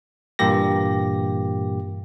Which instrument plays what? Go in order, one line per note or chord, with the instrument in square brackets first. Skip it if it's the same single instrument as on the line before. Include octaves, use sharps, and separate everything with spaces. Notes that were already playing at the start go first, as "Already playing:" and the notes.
[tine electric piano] G2 A#2 E3 A#3 G4 A#6